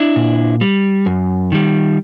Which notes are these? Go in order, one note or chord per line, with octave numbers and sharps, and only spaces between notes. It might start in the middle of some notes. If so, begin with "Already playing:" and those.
Already playing: D4 E4
A#2
G3
F#2
D#3 G3